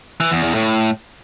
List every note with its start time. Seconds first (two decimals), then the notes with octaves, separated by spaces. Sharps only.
0.20 E3
0.32 E2
0.43 E2
0.54 A2